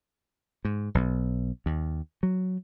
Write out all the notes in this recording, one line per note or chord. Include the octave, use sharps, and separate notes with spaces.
G#2
B1
D#2
F#3